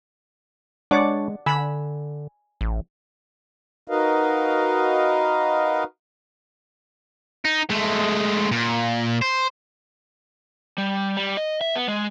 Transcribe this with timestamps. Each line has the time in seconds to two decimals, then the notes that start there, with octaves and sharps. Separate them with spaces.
0.91 G#3 D4 C#5 D5 F#5 D6
1.46 D3 G#5 B5 E6
2.61 A1
3.88 D#4 F#4 A#4 B4 D#5 F5
7.45 D#4
7.70 G#3 A3
8.51 A#2
9.22 C5
10.78 G3
11.17 G3
11.37 D#5
11.61 E5
11.76 B3
11.88 G#3